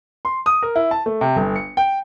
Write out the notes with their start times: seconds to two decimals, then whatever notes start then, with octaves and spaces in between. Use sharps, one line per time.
0.25 C6
0.46 D#6
0.63 A#4
0.76 E4
0.91 A5
1.06 A3
1.21 C3
1.36 G1
1.56 C#7
1.77 G5